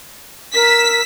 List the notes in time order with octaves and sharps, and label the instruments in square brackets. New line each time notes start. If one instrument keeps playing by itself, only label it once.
[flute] A#4 [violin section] E6 B6